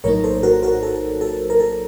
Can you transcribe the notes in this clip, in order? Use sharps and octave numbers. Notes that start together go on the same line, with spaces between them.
A#1 A2 F#3 A#3 D#4 A#4 C#5
A4 C5
F#4 A#4
F#4 A#4
A4
A4
A#4
A4